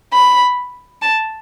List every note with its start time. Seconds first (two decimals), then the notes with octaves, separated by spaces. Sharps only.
0.14 B5
1.02 A5